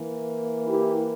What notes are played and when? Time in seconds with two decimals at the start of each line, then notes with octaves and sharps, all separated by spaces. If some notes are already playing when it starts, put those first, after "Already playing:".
Already playing: E3 A#3
0.67 E4 G4